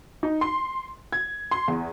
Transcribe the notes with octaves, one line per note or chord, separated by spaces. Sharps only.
D#4
C6
G#6
C6
E2